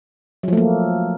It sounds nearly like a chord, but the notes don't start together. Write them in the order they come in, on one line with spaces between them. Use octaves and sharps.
F#3 F3 A3 A#3